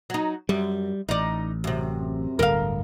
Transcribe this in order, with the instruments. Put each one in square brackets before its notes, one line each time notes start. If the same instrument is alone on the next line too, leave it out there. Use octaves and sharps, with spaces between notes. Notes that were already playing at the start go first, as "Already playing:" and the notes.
[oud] F#3 D#4
[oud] F#2 [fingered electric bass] G3
[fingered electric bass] A1 [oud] D#4 D5
[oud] F#2 C3
[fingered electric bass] D1 G1 G2 [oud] A#4 F5